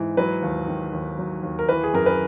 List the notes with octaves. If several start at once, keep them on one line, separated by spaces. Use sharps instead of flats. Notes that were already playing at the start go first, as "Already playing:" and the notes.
Already playing: G#2 E3
F#3 B4
D#2
D#3
D#2
F#3
D#2
A#4
E3 B4
G#4
F#2 A#4
B4